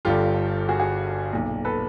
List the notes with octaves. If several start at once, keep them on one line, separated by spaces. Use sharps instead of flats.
G1 G2 D3 F4 G4
F#4 G#4
F#4 G#4
B1 A#2
A4 B4